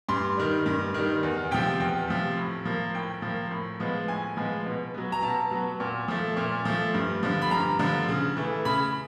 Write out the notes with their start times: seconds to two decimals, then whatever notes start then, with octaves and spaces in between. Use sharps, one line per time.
0.09 G2 C6
0.37 D#3 G3
0.66 G2
0.94 D#3 G3
1.23 E2
1.51 C3 F3 G5
1.80 E2 G5
2.08 C3 F3
2.37 A2
2.66 F3 A#3
2.94 A2 G5
3.22 F3 A#3
3.51 A2
3.80 F3 G#3 B3
4.08 A2 G#5
4.37 F3 G#3 B3
4.66 B2
4.94 F#3 B3
5.12 A#5
5.22 B2 A5
5.51 F#3 B3
5.80 A#2
6.08 F3 A3
6.37 A#2
6.65 F3 A3
6.94 G2
7.23 D3 F3
7.42 B5
7.51 G2 A#5
7.79 D3 F3
8.08 C#3
8.37 E3 A3
8.65 C#3 B5